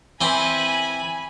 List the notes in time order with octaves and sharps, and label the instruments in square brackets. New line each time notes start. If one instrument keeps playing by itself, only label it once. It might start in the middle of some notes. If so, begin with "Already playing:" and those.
[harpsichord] E3 C4 [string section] G#5 B5